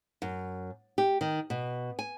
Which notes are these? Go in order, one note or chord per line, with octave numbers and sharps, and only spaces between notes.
F#2
G4
D#3
B2
G#5